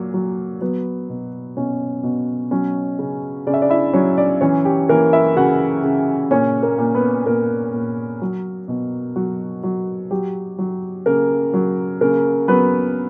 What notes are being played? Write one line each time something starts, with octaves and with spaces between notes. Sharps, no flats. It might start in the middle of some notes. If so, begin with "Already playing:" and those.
Already playing: A#2 F#3
F#3
F#3 B3 B4
B2
B2 C#4 C#5
B2
F#3 C#4 C#5
C#3
C#3 D5
E5
D4 D5
E4 E5
F#3 C#4 C#5
D4 D5
E3 C#4 C#5
G4
E3 A#3 A#4
E4 E5
C#3 F#4 F#5
C#3
A#2 C#4 C#5
A#3 A#4
A#2
B3 B4
A#2 A#3 A#4
A#2
F#3
B2
F#3 F#4
F#3
F#3 G4
F#3
C#3 A#3 A#4
F#3
C#3 A#3 A#4
F#3 B3 B4